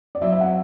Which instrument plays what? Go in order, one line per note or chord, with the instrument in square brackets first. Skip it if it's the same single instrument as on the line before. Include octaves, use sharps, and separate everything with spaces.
[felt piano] D5
[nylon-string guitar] F#3 C4 E4 [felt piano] E5
[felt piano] E5
F#5